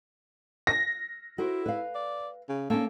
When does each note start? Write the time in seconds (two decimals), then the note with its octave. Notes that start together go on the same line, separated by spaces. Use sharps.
0.67 A#6
1.38 E4 F#4 A#4 C5
1.66 B4 F5
1.95 D5
2.49 C#3
2.70 A#3 C#4 A4